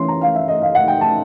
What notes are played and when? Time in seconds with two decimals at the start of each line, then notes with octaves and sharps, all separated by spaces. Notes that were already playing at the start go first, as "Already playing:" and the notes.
Already playing: E3 A3 C#4 C6
0.08 A#5
0.21 F5
0.35 E5
0.48 D#5
0.62 F5
0.75 F#5
0.88 G5
1.01 A5